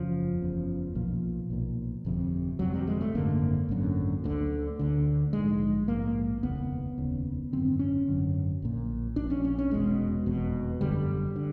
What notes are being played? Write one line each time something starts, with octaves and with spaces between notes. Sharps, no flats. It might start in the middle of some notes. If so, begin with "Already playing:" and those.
Already playing: F#1 E2 C#3 F3
F#1 E2 C#3
B1 A#2 F3
B1 A#2
G1 F2 C3
G1 F2 C3 F#3
G3
G#3
A3
G#1 F#2 D3 A#3
G#1 F#2 D3
D2 D3
D2 D3
A#1 G#2 G#3
A#1 G#2 A#3
F1 D#2 C#3 B3
F1 D#2 C#3
G#1 F#2 D3 C4
C#4
G#1 F#2 D3
A#1 A#2
A#1 A#2 D4
C#4
C#4
C#4
F1 E2 B2 G#3
F1 E2 B2
G1 F#2 D3 G3
D3